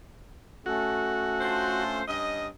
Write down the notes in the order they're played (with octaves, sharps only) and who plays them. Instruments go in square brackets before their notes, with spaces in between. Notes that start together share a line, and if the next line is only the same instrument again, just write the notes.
[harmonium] A3 C#4 A4 [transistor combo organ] F#4
[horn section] D4 F4 C5
G2 C#4 D#5